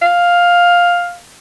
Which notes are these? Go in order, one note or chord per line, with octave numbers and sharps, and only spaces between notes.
F5